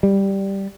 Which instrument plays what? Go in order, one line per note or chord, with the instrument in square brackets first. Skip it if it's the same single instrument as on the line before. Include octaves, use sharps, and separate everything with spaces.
[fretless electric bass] G3